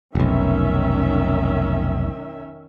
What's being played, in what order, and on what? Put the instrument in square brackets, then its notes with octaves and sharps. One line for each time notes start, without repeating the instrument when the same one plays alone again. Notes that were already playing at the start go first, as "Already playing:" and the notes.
[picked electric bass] F1 B1 [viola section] D#3 C#4 E5